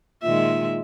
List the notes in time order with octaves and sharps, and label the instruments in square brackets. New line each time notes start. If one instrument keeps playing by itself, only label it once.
[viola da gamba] A#2 D#3 G#3 [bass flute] F4 [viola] E5